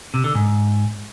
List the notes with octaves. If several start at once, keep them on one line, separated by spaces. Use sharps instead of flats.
C3
D3
G#2